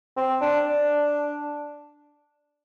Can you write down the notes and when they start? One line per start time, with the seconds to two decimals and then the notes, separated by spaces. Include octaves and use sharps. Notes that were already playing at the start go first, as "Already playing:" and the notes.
0.17 C4
0.41 D4
0.68 D4